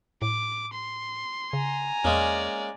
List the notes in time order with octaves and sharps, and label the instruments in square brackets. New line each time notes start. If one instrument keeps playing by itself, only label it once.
[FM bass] A2 [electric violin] D6
[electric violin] C6
[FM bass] C#3 [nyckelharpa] G#5 A#5
[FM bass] E2 [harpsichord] G#3 A#3 C#4 [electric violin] D5